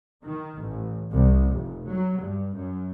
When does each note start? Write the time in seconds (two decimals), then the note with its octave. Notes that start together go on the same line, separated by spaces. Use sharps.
0.23 D#3
0.60 A1
1.12 C2
1.51 F1
1.87 F#3
2.18 G2
2.54 F#2